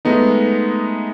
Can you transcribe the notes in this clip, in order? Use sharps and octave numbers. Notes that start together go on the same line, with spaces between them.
G#3 A3 B3 D#4